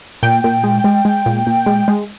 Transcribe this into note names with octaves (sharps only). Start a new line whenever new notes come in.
A#2 G5
A#2
G#3
G#3
G#3
A#2
A#2
G#3
G#3